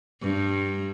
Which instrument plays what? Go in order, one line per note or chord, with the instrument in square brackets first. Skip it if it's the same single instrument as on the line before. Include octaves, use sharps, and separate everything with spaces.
[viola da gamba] G2